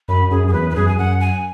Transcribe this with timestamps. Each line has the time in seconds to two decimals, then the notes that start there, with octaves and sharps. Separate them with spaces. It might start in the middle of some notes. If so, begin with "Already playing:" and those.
0.08 F#2 B5
0.31 F#2 G#4
0.44 F#2 G#4
0.53 E2 B4
0.70 B4
0.75 F#2 G#4
0.88 G#5
0.98 F#2 F#5
1.20 G#5